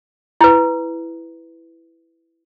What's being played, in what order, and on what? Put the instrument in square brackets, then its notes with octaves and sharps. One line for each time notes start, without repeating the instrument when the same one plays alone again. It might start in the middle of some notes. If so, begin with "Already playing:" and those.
[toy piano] E4 B4